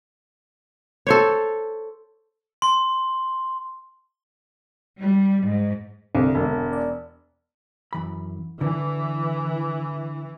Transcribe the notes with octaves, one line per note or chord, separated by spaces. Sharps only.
A4 C5 C#5
C6
G3
G#2
C2 D3
E1
D5
F#2 E3 B5
D3 E3